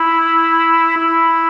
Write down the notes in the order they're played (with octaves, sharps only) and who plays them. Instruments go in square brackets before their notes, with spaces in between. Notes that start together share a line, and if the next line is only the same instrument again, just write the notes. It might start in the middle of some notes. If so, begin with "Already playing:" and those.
Already playing: [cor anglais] E4
E4